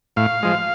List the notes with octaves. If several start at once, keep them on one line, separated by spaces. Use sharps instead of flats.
A2 F5
F3 G#3